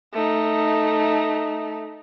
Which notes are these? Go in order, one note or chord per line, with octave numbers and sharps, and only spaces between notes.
A3 D#4